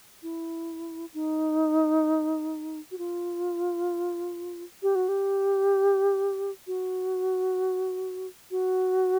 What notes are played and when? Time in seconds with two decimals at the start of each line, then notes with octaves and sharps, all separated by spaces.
0.23 E4
1.14 D#4
2.91 F#4
2.98 F4
4.83 G4
4.95 F#4
5.08 G4
6.67 F#4
8.51 F#4